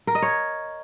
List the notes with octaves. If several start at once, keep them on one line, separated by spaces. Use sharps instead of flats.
A#4
D#5
C#5